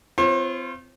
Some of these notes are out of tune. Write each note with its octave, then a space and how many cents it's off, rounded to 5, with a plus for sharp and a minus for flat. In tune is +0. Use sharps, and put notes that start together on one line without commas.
C4 -25 F4 -25 C5 +45